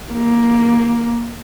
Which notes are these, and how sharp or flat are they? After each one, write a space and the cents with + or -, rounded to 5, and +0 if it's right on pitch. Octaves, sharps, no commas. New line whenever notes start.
A#3 +10